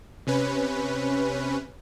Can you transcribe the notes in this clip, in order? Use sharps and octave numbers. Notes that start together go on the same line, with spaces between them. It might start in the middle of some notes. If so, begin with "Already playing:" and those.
C3 C#4 B4